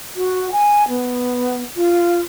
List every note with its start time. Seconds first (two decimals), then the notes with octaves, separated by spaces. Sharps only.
0.16 F#4
0.52 G#5
0.88 B3
1.76 F4